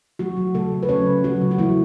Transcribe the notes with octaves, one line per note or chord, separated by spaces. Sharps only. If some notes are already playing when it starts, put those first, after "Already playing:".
F#3 A3 F#4
F#3
C#3 A3 A4
C#3
B4
F#3 C#4 C#5
C#3
F#3 F#4
C#3
F#4
E3 A3 E4